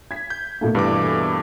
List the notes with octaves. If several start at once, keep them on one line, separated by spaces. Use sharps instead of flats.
G#6 B6
G6
B2 A3 A#3
G2 E3 D6